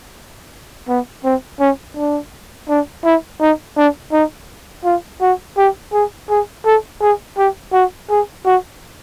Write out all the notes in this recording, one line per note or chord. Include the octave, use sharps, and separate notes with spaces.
B3
C4
C#4
D4
D4
E4
D#4
D4
D#4
F4
F#4
G4
G#4
G#4
A4
G#4
G4
F#4
G#4
F#4